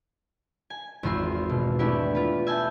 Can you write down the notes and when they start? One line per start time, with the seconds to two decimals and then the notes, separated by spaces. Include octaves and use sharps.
0.70 G#5
1.03 G#1 E2 D#3 F4 C6 E6
1.49 B2
1.79 A3 B3 D4 E4 G4
2.15 F4 B4
2.47 E5 G#5 A5 G6